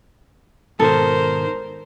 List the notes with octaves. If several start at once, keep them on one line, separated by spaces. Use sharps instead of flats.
G#2 B2 D#3 A4 A#4 C5